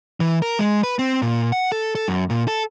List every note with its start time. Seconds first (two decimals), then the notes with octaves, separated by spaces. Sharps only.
0.20 E3
0.42 A#4
0.59 G#3
0.83 B4
0.99 C4
1.22 A#2
1.52 F#5
1.72 A4
1.95 A4
2.08 F#2
2.30 A#2
2.48 A4